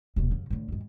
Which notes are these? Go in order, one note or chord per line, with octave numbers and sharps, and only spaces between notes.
D#1 B2
F#2 C#3
A2 D3
F2 G#2